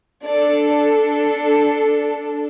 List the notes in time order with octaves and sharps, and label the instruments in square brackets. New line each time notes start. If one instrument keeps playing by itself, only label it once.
[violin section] D4 A4 D5